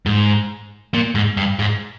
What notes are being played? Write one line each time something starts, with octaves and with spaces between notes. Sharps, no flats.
G#2
A#2
G#2
G2
G#2